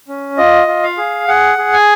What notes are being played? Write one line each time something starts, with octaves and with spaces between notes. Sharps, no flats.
C#4
F4 D#5
F4
F5
G#4
G#4 F#5
G#4
G#5